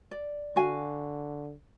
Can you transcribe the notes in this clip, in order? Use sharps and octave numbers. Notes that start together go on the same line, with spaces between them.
D5
D3 F#4 F5 G#5